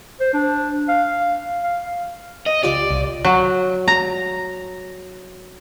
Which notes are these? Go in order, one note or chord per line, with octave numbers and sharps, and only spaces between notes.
C5
D4
F5
F5
D#5
C#2 F4 G4 D5
C2
F#3
A#5